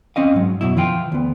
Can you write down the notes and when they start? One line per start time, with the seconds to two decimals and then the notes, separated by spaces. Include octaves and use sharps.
0.16 C4 C#4 D#5 F5
0.34 G#2 F#3
0.61 F#2 B2 E4
0.77 E3 F3 F4 G5
1.12 D2 B3